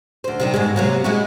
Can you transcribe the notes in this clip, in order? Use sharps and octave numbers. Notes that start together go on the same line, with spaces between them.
D2 C5
C3 D#3 G3
G#2 B2 G#3
C3 F#3 A#3
G#3 E4 F#4